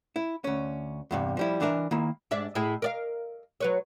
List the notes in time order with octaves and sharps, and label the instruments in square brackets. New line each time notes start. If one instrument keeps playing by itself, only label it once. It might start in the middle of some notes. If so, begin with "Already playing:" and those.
[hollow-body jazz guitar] E4
D2 C#4
E2 G2 C3
F3 G3 E4
E3 D4 A#4 E5
D#3 A#3 E4
[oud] G#2 D4 E5
A2 E4 G#4
A#4 D5 F5
F#3 B4 C#5